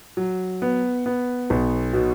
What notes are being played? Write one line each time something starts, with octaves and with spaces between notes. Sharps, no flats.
F#3
B3
B3
B1
B2